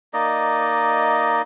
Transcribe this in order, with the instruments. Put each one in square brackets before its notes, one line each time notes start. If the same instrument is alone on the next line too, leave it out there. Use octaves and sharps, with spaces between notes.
[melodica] A#3 D#4 D5 D#5